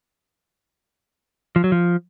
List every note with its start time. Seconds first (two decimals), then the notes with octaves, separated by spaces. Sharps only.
1.56 F3
1.64 F#3
1.72 F3